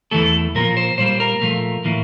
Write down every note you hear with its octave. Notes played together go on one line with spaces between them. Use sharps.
E2 E3 A3 A4
A#2 F3 A#3 A#4
C5
A#2 G3 A#3 C5
A#4
A#2 F3 A3
A2 E3 A#3